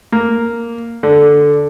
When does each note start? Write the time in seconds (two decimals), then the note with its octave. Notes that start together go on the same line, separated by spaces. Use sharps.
0.12 A#3
1.03 D3